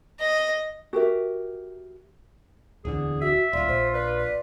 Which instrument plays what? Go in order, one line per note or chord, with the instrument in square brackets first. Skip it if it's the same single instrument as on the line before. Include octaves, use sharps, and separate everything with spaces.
[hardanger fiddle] D#5
[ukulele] F#4 G4 A#4 E5
[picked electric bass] D1 E2 D3 [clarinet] G#4
[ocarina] F#4 [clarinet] E5
[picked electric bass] D1 [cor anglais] F4 [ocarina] D5
[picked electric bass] A#1 [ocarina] C5
[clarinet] B4 [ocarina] D5
[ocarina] D5